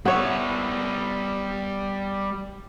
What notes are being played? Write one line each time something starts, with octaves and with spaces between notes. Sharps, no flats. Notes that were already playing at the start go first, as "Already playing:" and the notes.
G3 B3 C#5 E5